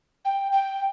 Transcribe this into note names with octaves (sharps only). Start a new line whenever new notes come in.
G5
G5